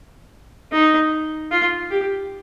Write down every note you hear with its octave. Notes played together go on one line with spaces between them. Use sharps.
D#4
F4
G4